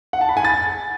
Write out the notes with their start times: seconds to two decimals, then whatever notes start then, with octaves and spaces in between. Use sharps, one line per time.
0.13 F#5
0.21 A5
0.29 B5
0.37 G#5
0.45 A6